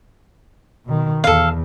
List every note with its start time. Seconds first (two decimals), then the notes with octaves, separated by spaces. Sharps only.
0.85 B2 D#3
1.24 E2 A4 F5